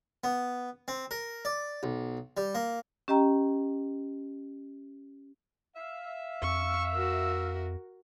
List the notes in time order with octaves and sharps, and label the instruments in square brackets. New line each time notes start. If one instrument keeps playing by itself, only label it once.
[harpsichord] B3
C4
A#4
D5
B1
G3
A#3
[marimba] C#4 G4 D#5 G5 A#5
[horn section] E5 F5
[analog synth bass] F2 [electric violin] C#6 [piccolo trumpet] E6
[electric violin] F#4 A#4